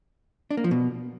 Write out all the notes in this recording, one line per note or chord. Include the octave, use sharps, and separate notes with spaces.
D4
A#3
F3
B2